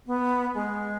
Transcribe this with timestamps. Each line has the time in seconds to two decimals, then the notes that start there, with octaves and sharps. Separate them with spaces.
0.07 B3
0.55 G#3